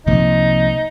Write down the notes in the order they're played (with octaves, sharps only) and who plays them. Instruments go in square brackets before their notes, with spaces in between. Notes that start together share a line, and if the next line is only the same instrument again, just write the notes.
[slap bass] C2 C3 F3 A#3 [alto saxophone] D#4